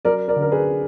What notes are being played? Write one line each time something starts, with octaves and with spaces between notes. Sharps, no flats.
F#3 A#4 D5
A#4 D5
D3
A#4
G#4 B4